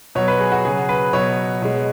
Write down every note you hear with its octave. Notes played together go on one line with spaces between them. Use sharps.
B2 F#3 C#5
B4
G#4
F#4
C#3 F#3 G#4
B4
B2 F#3 C#5
B2 G#3